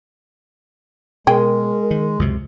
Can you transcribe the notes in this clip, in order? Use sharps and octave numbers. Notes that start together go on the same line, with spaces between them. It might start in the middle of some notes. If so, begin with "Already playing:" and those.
B2 G#3 G#4 A#4 G5
D#3
C#2 F#2 C3